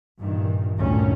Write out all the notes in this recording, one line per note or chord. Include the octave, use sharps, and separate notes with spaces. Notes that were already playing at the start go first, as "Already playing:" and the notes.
G2 A#2 D#3 E3
D2 G2 A#2 D3 D#3 C#4